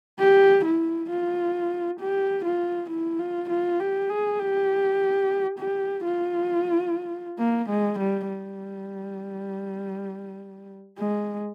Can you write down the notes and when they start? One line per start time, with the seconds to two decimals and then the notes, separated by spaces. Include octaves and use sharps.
0.20 G4
0.65 E4
1.10 F4
2.00 G4
2.45 F4
2.90 E4
3.19 F4
3.50 F4
3.80 G4
4.10 G#4
4.40 G4
5.59 G4
6.05 F4
7.39 A#3
7.69 G#3
7.99 G3
8.29 G3
10.98 G#3